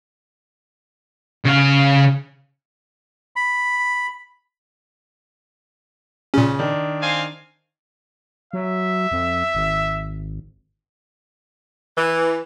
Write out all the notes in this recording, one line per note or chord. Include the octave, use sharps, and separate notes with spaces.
C#3 F5
B5
A#2 C#3 C#4
D#3 D4
C4 F5 G#5
F#3 E5
F2
G#1
E3